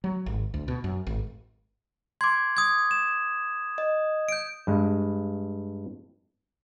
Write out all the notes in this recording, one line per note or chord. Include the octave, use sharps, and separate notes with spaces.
F#3
G#1
D2
B2
F#2
G#1
C6 D6 G#6
D#6 G#6
E7
D#5
G6 D7
G2 G#3